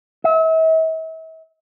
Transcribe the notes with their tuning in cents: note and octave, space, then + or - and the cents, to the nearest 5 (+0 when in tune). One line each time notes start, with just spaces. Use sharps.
E5 -40